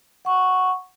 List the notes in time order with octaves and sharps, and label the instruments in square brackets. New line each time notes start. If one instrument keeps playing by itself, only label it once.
[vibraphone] F#5 C#6